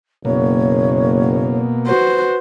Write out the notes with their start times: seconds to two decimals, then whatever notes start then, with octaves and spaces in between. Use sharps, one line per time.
0.25 F#1 B2 A#3 C#5
1.86 F#4 B4 C5